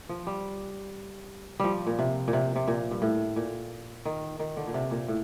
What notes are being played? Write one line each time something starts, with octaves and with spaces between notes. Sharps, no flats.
F3
G3
F3 G3
A#2
C3
A#2
C3
C3
A#2
G2
A2
A#2
D#3
D#3
D3
A#2
C3
A#2
A2